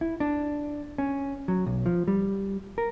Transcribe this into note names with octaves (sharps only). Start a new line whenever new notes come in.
E4
D4
C#4
F#3
B1
F3
G3
A#4